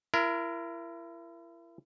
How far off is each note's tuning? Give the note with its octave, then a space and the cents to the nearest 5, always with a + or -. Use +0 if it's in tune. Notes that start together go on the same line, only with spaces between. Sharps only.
E4 +35 A#4 +0